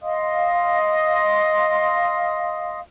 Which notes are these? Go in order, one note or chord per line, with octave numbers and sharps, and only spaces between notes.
D#5 F5 C6 D#6